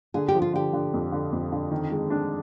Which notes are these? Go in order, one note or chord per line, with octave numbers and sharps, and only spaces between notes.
D3 G#4
G4
F3
F4
D3 G4
D3
F2
D3
F2
D3
D#3
G#3
D4